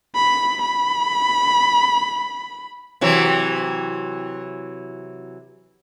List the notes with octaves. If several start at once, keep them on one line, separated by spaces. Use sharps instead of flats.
B5
B5
C3 E3 F#3